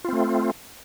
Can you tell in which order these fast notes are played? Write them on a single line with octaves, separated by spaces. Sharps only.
F4 C4 A3